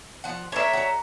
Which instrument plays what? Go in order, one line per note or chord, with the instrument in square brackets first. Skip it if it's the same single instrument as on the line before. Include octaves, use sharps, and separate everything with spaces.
[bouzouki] F3 F#5
[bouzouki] A3 D4 A#4 [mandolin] C#5 E5
[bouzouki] F#4 A4 A#5